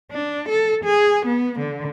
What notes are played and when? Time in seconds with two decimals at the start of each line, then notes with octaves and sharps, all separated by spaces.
0.11 D4
0.49 A4
0.84 G#4
1.26 B3
1.59 D3